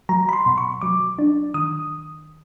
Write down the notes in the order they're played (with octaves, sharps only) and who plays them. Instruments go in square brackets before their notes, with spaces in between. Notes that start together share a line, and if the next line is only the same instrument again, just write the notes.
[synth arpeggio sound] F#3 A#5
B5
C6
B2
C#6
F#3 D6
D4
D#3 D#6